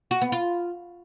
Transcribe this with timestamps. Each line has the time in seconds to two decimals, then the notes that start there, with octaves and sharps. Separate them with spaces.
0.11 F#4
0.22 B3
0.32 F4